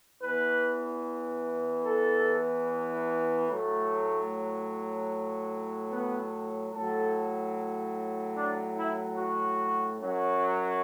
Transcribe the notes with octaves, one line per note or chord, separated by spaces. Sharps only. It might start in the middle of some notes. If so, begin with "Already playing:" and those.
E2 E3 B4
A4
A2 F#3 A3
B3
A2 F#3 A4
D4
E4
F#4
F#2 F#3